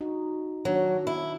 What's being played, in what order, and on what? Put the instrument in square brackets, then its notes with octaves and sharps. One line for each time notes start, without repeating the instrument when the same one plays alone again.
[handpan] D#4 F#4
[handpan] D#3 D4 F#4 [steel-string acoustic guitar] F#3
[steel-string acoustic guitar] E4